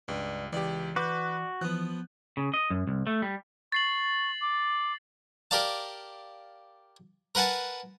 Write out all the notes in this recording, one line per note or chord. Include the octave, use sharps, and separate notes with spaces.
C#2 G2
C#2 E3 G4 D5
F#4 B4 D6 G6
E3 F3 B3 F#6
C#3
D#5
F#2
C2
A3
G3
C#6 A6 C7 F#7
D6
G4 A#4 D5 F5 A5
A#4 B4 F#5 G#5 A5